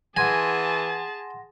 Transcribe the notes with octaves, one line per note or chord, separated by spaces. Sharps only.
E3 G#4 F#5 G#5 A5 C6 A#6